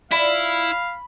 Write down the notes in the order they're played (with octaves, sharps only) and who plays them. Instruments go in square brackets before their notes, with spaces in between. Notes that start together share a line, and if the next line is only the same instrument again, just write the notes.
[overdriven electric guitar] E4 [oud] F4 D5 [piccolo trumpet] F5 [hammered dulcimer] B5